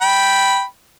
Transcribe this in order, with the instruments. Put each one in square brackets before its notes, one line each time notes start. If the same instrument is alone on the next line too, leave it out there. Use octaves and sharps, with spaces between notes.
[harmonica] G5 B5